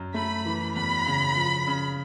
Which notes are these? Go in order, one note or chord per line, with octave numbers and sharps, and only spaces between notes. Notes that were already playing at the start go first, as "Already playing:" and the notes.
Already playing: F#2
A3 B5
E3
E2 B5
C#3
F3
C#3